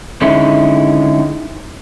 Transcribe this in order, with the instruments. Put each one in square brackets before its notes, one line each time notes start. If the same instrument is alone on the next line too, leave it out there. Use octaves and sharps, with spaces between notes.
[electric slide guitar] D3 G#3 C#4 D#4 E4